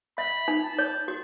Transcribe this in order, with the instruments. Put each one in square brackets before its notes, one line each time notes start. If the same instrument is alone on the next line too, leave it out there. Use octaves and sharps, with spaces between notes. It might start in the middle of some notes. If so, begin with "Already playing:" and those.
[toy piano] E5 [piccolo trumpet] B5
[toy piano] D#4
[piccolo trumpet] A5
[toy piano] C#5
F#4